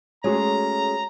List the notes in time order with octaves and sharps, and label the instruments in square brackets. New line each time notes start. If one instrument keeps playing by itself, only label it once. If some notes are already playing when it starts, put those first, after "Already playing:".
[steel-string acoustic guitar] G#3 A3 C#4 [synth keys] F#4 G#4 C#5 [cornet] A#5